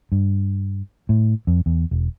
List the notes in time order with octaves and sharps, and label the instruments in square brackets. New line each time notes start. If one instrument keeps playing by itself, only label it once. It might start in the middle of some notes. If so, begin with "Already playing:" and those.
[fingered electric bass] G2
A2
F2
E2
E1